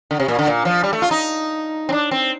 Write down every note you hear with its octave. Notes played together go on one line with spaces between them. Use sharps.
D3
C3
A#2
D3
A#2
F3
G3
A3
F4
D#4
C4
D4
C4